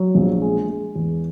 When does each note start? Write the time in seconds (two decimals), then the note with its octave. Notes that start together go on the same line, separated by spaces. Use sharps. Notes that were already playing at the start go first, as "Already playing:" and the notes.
Already playing: F#3
0.15 A#1
0.42 G#3
0.69 G#3
0.95 E2